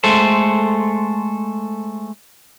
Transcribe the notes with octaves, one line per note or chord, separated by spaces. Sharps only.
G#3 A3 A4 C5